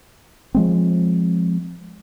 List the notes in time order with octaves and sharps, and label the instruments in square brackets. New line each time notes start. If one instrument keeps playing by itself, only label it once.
[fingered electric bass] F3 G#3 C4